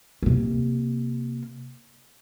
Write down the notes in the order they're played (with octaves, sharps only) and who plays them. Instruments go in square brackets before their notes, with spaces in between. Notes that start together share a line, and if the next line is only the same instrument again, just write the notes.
[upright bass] C3 A#3